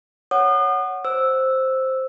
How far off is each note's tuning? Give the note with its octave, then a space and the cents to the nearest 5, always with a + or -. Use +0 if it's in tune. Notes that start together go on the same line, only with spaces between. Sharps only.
C#5 +0 F#5 +0 D#6 -40
C5 +5 E6 +0